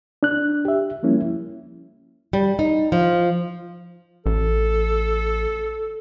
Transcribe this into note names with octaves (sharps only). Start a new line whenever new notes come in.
D4 F#6
G4 E5
F3 G3 A#3 C#4 E4
G3
D#4
F3
A1 A4